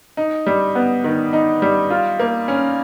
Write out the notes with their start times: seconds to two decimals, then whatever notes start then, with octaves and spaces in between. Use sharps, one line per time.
0.17 D#4
0.47 G3
0.75 B3
1.04 D#3
1.33 D#4
1.62 G3
1.90 F4
2.19 A#3
2.48 C#4